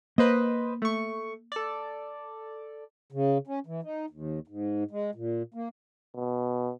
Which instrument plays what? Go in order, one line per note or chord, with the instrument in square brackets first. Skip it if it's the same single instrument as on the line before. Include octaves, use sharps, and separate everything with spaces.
[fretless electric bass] A#3 [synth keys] B4 C5 D#5
[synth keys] A3 C#6
A4 D5
[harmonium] C#3
C#4
E3
D#4
D#2
G#2
G#3
A#2
A#3
[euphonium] B2